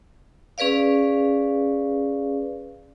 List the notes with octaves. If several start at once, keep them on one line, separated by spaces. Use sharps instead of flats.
C#4 G#4 B4 D5 F5